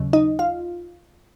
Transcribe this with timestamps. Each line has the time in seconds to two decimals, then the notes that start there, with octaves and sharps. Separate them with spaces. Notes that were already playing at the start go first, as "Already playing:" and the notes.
Already playing: D#2 C#3 F#3
0.13 D#4 D#5
0.39 F4 F5